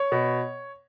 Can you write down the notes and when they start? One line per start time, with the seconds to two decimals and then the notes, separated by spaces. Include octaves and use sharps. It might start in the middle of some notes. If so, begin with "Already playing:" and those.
Already playing: C#5
0.12 B2